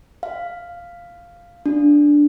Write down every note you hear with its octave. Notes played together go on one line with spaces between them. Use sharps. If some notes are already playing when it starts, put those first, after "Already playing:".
F5
D4